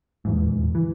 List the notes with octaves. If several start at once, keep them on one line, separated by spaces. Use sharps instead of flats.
D#1 E2 G#2
E3